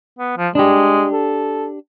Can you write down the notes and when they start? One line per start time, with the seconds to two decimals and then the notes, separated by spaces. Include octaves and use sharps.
0.19 B3
0.38 F3
0.55 G#3 D4 G4
1.13 A4